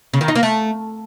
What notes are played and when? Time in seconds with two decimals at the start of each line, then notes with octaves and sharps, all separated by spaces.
0.14 C#3
0.21 D#3
0.28 D#4
0.35 A#3
0.43 A3